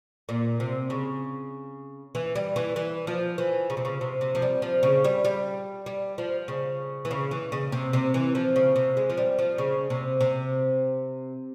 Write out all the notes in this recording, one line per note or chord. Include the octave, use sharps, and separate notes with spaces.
A#2
C3
C#3
E3
G3
E3
E3
F3
E3
C#3
C3
C#3
C3
C3
F3
G3
F3
C#3
G3
G3
G3
F3
C#3
E3
C#3
E3
C#3
C3
C3
E3
F3
C#3
C3
G#3
F3
G3
F3
C#3
C3
C3